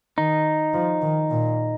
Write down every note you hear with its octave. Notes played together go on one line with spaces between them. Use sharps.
D#3 D#4
F3
D#3
A#2